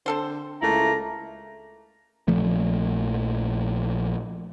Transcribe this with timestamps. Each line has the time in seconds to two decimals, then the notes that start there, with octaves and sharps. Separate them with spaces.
0.06 D3 C4 A4 C5
0.62 C#2 A3 A#3 E4 A#5
2.28 A#1 F3 A3